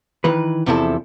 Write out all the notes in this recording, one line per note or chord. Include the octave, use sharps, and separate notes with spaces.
D#3 E3 B4
E2 C3 F3 E4 A4